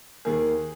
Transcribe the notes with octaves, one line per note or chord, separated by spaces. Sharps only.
D#2 D#3 A#3 G#4